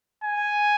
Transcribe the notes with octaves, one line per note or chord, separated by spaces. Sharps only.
G#5